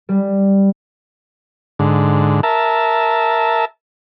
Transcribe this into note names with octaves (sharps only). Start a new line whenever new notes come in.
G3
G#2 D3
A#4 E5 A5